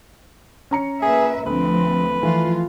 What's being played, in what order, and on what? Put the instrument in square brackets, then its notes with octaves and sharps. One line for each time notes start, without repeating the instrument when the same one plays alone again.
[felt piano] C#4 A#5 C#7
[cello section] A#2 B4 E5 [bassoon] G#4
[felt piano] D2 [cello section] F3 A3 C4 [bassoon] B4
[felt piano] E3 A3 [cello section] F3 F4